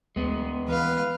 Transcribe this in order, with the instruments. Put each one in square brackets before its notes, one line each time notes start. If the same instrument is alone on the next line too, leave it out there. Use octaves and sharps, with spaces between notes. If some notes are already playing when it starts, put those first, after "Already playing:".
[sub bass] D2 [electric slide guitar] G#3 B3
[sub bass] E3 [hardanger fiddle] B4 F5